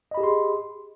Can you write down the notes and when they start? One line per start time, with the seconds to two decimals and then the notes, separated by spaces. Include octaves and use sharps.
0.11 D#5
0.14 B5
0.17 G4
0.21 G#4
0.24 C6